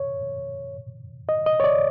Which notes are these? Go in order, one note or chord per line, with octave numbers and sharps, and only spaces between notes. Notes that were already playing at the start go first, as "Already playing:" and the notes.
Already playing: C#5
D#5
D#5
C#5
D5